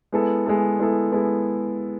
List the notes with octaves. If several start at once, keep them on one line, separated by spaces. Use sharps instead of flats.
G#3 B3 E4 A4
G#3 B3 E4 A4
G#3 B3 E4 A4
G#3 B3 E4 A4